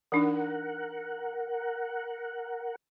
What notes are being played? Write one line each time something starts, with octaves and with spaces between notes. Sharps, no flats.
E3 D4 D#4 A#4 F#5